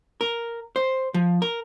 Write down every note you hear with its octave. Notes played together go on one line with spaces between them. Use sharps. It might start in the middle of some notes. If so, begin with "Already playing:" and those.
A#4
C5
F3
A#4